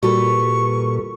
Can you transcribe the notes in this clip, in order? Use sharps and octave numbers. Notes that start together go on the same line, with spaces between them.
A#2 G3 F#4 A4 B4 C#6